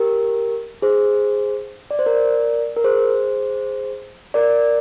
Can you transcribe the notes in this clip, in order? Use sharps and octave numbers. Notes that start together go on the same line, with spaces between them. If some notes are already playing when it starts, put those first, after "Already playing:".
Already playing: G4 A#4
G#4 C5
D5
C5
A#4 D5
A#4
G#4 C5
A#4 D5